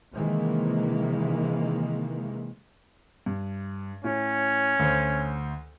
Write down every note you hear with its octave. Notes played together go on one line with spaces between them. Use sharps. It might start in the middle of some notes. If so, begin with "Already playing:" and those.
C3 D#3 E3 G#3 A#3
G2
A2 C#4
D2 C5